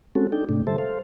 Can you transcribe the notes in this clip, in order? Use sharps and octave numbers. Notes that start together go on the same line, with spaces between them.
G#3 C4 C#4 F#4 A4
D4 D#4 A4 G5
G#2 C3 A3 D4
D3 G3 A4 C5 E5 A5
A4 C5 F5